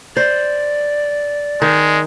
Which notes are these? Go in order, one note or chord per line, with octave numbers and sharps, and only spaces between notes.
C5 D5
D#3 G#3